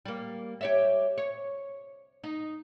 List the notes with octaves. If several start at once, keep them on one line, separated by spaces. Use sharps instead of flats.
G3 A#3
G4 C#5 E5
C#5
D#4